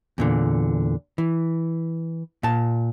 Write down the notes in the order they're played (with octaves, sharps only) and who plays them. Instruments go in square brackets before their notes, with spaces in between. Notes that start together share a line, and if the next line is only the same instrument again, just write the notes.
[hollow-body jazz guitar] E2 A#2 D3
E3
A#2 A5